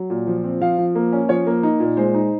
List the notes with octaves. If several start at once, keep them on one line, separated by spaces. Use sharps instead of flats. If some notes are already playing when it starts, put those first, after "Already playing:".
Already playing: F#3
A#2
F3
C4
F3 F5
F3
A#3
C#4
F3 C#5
A#3
D#4
A#2
G#3 C5
D#4